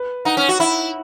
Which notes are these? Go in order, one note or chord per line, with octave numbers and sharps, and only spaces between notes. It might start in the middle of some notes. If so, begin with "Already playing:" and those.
Already playing: B4
D#4 F#5
C#4
F#4
E4 F#5